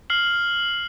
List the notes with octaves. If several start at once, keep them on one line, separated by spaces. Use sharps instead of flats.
F6 C7 F#7